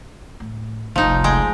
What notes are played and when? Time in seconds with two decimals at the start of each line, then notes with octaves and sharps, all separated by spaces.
0.40 A2
0.96 F1 C2 F3 D#4
1.24 G#3 G5